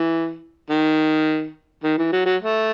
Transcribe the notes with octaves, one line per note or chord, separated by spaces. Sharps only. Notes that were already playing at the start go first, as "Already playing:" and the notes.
Already playing: E3
D#3
D#3
E3
F#3
F#3
A3